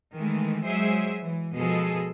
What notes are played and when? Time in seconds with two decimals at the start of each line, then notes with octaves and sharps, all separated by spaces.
0.14 D#3 E3 G#3 A3
0.65 F#3 G#3 G#4 C5 E5
1.22 E3
1.55 B2 F3 G#3 G#4 A4 D#5